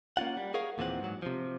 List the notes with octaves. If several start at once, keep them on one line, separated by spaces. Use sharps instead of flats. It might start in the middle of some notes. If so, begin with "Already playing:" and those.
A#3 C#4 F4 F#5
G3
G#4 A#4 C#5 F5 F#5
D#2 A#2 E3 C4 F#5
G#2 F#3
C3 F3